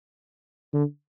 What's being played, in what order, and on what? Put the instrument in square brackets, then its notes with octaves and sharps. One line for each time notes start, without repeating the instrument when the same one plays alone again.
[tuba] D3